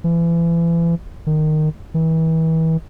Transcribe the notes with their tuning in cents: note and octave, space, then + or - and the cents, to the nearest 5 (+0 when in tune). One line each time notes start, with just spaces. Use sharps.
E3 +35
D#3 -15
E3 -35